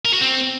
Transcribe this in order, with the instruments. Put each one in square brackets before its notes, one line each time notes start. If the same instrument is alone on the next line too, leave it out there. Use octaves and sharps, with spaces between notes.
[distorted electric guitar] A#4
F#4
C4